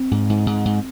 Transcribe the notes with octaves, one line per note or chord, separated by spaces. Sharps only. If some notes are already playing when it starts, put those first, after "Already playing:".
Already playing: C4
G#2
G#2
G#2
G#2